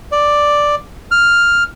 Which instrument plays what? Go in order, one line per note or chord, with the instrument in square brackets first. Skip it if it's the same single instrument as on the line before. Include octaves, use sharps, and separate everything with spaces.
[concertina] D5
F6